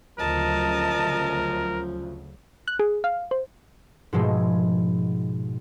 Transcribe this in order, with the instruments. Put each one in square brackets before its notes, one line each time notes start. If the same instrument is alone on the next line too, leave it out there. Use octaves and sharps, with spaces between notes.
[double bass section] D2 C#3 F#3 [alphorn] F3 [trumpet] A#4 [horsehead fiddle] D#5 A5
[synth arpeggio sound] F#6
G#4
F5
C5
[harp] G#2 B2 F3 G#3 A3